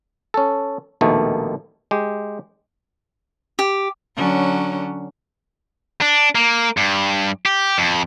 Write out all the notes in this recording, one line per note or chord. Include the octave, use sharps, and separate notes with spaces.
C#4 A4
A#1 D#2 B2 D#3 A3
G#3 G4
G4
D3 F#3 C#4
D4
A#3
G2
G4
F2